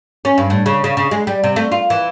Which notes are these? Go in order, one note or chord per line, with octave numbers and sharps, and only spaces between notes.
C#4
G2
A2
C#3
C#3
C#3
G#3
G3
C3
A3
F4
E3